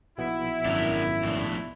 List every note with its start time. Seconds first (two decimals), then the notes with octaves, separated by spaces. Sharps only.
0.18 A#1 B2 B3 E4
0.65 G#1 F#2 D4 A#4
1.23 F2 A2 D4